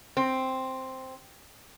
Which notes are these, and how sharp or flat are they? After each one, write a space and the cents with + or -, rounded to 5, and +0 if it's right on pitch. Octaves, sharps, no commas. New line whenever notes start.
C4 +0